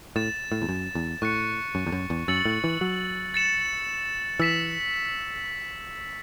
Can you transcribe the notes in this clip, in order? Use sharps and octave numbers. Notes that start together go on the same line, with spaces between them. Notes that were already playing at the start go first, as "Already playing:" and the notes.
A2 A6 E7
A2
E2
F#2
E2
A2 C#6 F#6 C#7
F#2
E2
F#2
E2
F#2 E6 A6 C#7 F#7
A2
E3
F#3
A6 C#7 E7
E3 E6 B6 E7